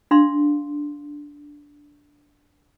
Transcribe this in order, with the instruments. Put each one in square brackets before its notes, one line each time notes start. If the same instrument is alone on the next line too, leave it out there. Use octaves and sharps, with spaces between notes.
[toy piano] D4 F5 C6